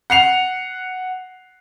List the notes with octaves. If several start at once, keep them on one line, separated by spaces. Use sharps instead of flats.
F#5 C7 F7